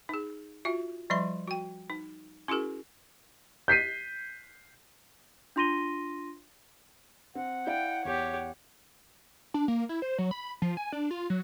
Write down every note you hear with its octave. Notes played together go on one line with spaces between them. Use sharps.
D#4 G#4
F4 F#4 E5
F3 G3 D5 E5 B5 C6
F#4 G5
D#4
C#4 E4 F#4 G#4 A#4
G6 B6 C7 D#7
D4 F4 C6 A#6 D#7 G7
C4 F#5
E4 D5 F5 G5
E2 G4 C#5
D4
A#3
E4
C5
F#3
B5
F3
G#5
D4
F4
F#3